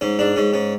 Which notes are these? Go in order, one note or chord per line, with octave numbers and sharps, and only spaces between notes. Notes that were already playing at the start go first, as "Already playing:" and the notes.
G#2 C#4
G#2 D4
G#2 C#4
G#2 C#4